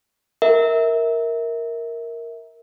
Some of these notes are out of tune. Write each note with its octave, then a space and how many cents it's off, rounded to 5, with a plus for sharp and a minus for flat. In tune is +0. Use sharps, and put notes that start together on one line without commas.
A#4 +0 E5 -30